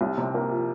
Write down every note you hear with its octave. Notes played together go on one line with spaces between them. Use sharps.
C2
C3
A#3
F3